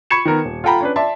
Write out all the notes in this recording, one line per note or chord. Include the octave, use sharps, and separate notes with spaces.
B5 C#6 G#6 C#7 E7
D#3 B3 A#4
D#1
F4 A4 F#5 G5 A#5 B5
C#4 D4 B4
D5 E5 A5 C6